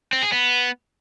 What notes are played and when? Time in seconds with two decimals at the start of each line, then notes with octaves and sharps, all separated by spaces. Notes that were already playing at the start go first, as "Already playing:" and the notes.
0.13 C4
0.22 G#4
0.32 B3